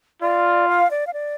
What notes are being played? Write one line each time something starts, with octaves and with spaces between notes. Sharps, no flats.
F4 D5
F5
D5
F5
D5